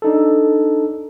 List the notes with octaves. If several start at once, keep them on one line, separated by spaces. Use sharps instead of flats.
D4 D#4 A4